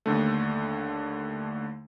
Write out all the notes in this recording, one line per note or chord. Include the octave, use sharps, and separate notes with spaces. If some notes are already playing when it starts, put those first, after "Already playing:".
D#2 D3 A3